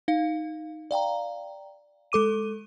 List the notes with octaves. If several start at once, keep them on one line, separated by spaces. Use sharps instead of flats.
D#4 F5
D5 F5 G5 A#5
G#3 A4 D6 D#7